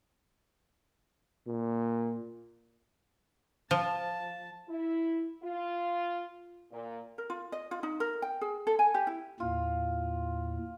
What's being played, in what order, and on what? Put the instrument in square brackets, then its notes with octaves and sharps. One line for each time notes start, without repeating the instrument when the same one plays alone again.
[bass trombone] A#2
[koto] F3 [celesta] F5 [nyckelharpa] A5
[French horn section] E4
F4
A#2
[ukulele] A#4
F4
D#5
F4
D#4
A#4
G5
G#4
A4
G#5
G4
E4
[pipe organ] D#2 A2 [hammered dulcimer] F4